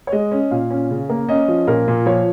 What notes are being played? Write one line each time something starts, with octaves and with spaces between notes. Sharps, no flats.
C#5
G#3 D#5
C#4
A#2 F5
C#4
C#3
A#3
C#4 D#5
F3
A#2 A#4
A#2
F3 C#5